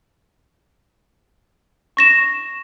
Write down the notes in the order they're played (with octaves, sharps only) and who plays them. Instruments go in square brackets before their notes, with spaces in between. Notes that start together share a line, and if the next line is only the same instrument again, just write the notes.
[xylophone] C#6 A#6 E7